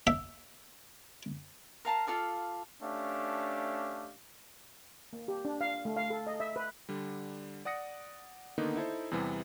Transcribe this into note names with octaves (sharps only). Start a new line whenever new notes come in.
E5
A#4 F5 A5 A#5
F4 A4 D5 F5
A3 C#4 D4 G4 F5
A#3
G4
D4
F5
A3
F5
A4
D#5
E5
B4
D3 G3
D5 F#5 D#6 A#6 C#7
D3 D#3 A#3 B3 D#4
D#4 E4 A4 C5
E2 C3 E3 G3 B3